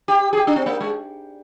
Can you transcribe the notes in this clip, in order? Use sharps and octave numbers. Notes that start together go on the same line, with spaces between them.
G4
G#4
G4
D4
C4
A#3
G#3